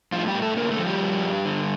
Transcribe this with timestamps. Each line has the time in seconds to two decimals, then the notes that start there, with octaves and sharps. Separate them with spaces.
0.12 A2 F3 F4
0.28 G3 G4
0.35 A2
0.42 A3 A4
0.57 D3 A#3 A#4
0.71 A3 A4
0.79 F3
0.86 G3 G4
1.01 G2
1.23 G2
1.46 D3